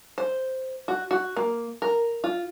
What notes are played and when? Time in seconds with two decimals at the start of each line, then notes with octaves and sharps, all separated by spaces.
0.18 C5
0.88 F#4
1.11 F#4
1.37 A#3
1.82 A#4
2.24 F4